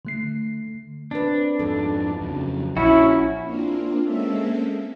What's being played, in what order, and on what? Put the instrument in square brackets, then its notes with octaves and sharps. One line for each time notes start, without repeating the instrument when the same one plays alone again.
[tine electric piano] D3 A3 C7
[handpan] C4 B4 [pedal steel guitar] D4
[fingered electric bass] F2 G#2 [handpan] A4
[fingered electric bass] F2 C#3 F#3
[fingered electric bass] A#1 [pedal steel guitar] C#4 F#4 [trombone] E4
[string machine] A#3 C4 D4 F4
G#3 A#3 C4 C#4 A4 E5